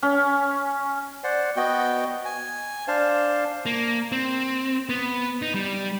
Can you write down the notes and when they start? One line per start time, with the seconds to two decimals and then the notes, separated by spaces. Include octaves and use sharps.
0.02 C#4
1.24 C5 D5 F#5
1.56 B3 F#4 D#5 G5
2.25 G#5
2.88 D4 C5 F5 A5
3.66 A#3
4.12 C4
4.89 B3
5.42 D#4
5.54 G3